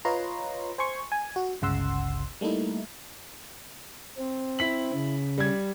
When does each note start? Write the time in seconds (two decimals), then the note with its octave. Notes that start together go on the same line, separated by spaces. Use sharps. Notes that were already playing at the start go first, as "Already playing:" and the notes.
0.05 F4 B4 C#5 D#5 A#5 C6
0.78 C5 G#5 C6 C#6
1.12 G#5
1.36 F#4
1.62 G1 C#2 C#3 F#5 C6 E6
2.41 G3 A3 A#3 D#4 E4
4.18 C4
4.59 E4 B6 F#7
4.93 C#3
5.38 G3 G#6